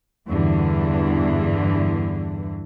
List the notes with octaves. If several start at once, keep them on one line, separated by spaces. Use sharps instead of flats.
E2 G2 D3 E3